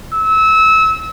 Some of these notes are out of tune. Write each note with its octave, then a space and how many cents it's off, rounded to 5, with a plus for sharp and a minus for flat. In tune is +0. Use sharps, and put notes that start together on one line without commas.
E6 -25